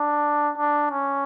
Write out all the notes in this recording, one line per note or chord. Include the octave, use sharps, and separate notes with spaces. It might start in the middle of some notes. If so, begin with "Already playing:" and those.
Already playing: D4
D4
C#4